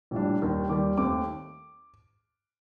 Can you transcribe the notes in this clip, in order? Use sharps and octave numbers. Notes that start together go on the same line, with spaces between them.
A#1 A2 G3 D4
D#2 D#3 G3
D#2 D#3 G3 D6
D#2 D#3 A3 C4 D6